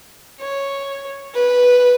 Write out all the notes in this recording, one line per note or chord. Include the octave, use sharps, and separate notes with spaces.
C#5
B4